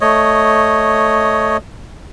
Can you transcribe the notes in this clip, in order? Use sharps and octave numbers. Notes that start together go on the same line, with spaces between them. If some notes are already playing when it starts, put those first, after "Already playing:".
A3 C#5 D#5